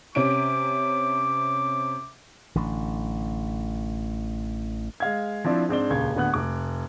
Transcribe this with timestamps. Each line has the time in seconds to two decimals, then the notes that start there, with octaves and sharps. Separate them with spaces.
0.15 C3 C#4 D6 D7
2.55 A1 D3
5.00 G#3 F5 G#6
5.44 F3 C4 D4 E4
5.69 G#2 C4 D4 G7
5.90 D#1 C#2 G#6
6.15 D1 D3 B3 F#5 F#6
6.33 F1 D6